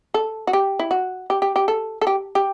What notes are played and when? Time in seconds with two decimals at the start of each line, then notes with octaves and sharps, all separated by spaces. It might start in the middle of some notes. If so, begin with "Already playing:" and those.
0.14 A4
0.47 F#4
0.53 G4
0.79 E4
0.91 F#4
1.30 G4
1.42 G4
1.56 G4
1.68 A4
2.01 A4
2.07 G4
2.35 G4